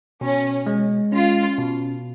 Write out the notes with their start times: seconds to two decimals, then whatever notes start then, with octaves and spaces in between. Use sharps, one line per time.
0.21 B2 C#4
0.67 G#3
1.12 C#4 F4
1.58 B2